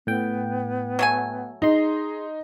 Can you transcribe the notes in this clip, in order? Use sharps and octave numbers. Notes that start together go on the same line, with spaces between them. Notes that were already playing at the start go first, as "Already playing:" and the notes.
A2 B3 G5
F#3 A3 G#5
D#4 G#4 A#5 C6